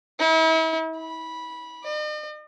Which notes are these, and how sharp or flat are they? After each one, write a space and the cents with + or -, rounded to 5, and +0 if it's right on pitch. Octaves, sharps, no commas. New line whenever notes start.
E4 -40
B5 -15
D#5 -45